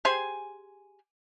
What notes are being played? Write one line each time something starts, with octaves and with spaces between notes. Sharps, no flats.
G4 G#4 C5 G#5